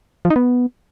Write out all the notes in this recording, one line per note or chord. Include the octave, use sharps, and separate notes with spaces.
F3
D#4
B3